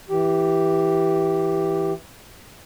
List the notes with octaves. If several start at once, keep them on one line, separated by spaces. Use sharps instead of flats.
E3 G4